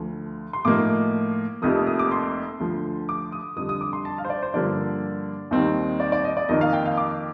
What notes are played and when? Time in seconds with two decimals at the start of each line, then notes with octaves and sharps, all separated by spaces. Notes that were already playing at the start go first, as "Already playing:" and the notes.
Already playing: D2 D3 F3
0.53 C6
0.65 A2 F3 A#3 D#4 D6
1.62 F1 F2 C3 F3 A#3 D#6
1.87 D#6
1.99 D6
2.12 C6
2.60 D2 D3 F3
3.09 D6
3.32 D#6
3.56 F2 D3 G3 D#6
3.69 D#6
3.81 D6
3.93 C6
4.05 A5
4.18 F5
4.25 C5
4.30 D5
4.43 C5
4.54 G2 D3 F3 A#3 D4 D5
5.51 D#2 D#3 G3 C4 D#4
6.00 D5
6.12 D5
6.24 D#5
6.37 D5
6.49 F2 D#3 A#3 D#4 D#5
6.61 F5
6.73 G5
6.86 F5
6.97 D6